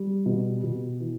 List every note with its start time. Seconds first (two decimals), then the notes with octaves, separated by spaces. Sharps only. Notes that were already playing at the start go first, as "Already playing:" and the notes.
Already playing: G3
0.26 B2
0.63 B2
1.00 E3